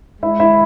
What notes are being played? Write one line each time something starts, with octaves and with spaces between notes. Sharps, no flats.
G#3 E4 E5
E4 E5